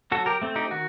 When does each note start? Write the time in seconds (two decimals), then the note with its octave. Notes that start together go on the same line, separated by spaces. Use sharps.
0.12 F#3 F#4 A4
0.26 G4 A#4
0.42 A3 C4
0.56 D#4 G4
0.71 D#3 F#4